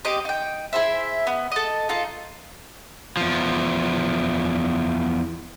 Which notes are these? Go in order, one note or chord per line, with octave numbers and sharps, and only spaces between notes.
C4 G4 D#5 D6
D#4 G5
E4 G#4 C5 E5
B3
A4 D#5
D#4 F4 A4
E2 F3